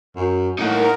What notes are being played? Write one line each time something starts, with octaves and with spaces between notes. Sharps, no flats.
F#2
A2 D#4 A#4 F#5